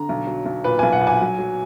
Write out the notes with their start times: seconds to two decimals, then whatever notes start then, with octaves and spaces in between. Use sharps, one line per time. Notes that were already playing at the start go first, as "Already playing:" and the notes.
Already playing: D3 A#5
0.09 B1
0.27 F#3
0.46 B1
0.64 A#2 B4
0.79 B1 G#5
0.93 F#5
1.01 A#2
1.07 G#5
1.21 F#3
1.39 F#3